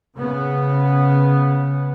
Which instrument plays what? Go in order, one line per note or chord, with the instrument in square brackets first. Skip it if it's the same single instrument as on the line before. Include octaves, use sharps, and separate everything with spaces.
[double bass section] C#3 B3